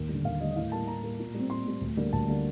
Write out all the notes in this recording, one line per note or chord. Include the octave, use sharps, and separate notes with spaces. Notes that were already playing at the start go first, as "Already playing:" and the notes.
Already playing: D#2
D3 G3
D#2 F5
D3 G3 D#5
D#5
A2 F5
G3 A#3 A5
A2 A#5
G3 A#3
A#2
G3 C4
A#2 C6
G3 C4
D2
D3 G3 A#3
D2 A5
D3 G3 A#3